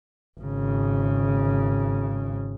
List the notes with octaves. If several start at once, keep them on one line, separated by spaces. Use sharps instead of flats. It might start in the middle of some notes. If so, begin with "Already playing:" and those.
G#1 C#3